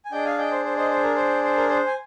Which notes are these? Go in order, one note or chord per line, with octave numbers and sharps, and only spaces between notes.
G#5
D4 G#4 D#5 G5
F5 G#5
D#5 G5
C5
C5
C5 D#5
C5
A#4
C5
C5
A#4
C5
G#5